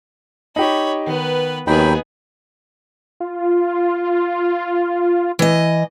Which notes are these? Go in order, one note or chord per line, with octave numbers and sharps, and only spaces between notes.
D#4 G4 C#5 B5
D#3 B3 B4
D#2 F#3 B3 D#4 G#4 G5 B5
F4
E3 D#5